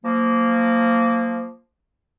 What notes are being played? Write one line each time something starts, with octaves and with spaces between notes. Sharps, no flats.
F3 F#3 A#3